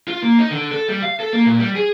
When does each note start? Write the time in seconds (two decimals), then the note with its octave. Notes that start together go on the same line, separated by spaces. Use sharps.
0.08 F4
0.22 A#3
0.38 D#4
0.50 D3
0.71 A4
0.88 G3
1.03 F5
1.20 A4
1.33 A#3
1.46 A#2
1.59 G3
1.75 G#4